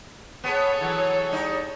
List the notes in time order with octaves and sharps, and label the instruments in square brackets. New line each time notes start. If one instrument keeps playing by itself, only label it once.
[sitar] B3 [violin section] G#4 A4 C#5
[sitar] E3 F#3
G3 D#4 D5